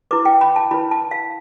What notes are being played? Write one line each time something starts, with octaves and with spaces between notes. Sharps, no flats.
E4 B4 D6
G5
B5
A5
E4 B4 B5
A5
F5